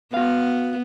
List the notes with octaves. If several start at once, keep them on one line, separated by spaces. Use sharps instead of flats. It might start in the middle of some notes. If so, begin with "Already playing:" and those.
B3 F#4 F5